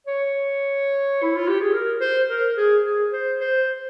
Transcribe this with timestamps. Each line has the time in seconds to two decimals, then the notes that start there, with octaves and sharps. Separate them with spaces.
0.07 C#5
1.22 E4
1.36 F4
1.48 G4
1.61 G#4
1.73 A#4
2.01 C5
2.29 A#4
2.57 G#4
2.85 G#4
3.12 C5
3.40 C5